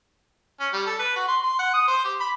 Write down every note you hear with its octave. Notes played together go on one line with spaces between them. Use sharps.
C#4
G3
A4
B4
F#4
C6
C6
F#5
D#6
C5
G4
B5